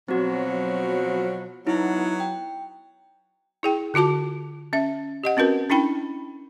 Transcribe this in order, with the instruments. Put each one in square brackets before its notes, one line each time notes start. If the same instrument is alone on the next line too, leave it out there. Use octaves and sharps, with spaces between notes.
[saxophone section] B2 F3 F#3 [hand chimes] C4 F#4
[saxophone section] F#3 B3 [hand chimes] D#4 E4
[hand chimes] G5
[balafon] E4 G#4 G5
D3 F4 F#4 A5 D6
C#4 E5
G4 D#5 F#5
C4 C#4 F#4 A#4 B4
C#4 D4 E4 G5 B5